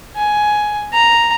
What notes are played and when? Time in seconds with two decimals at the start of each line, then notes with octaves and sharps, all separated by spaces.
0.16 G#5
0.93 A#5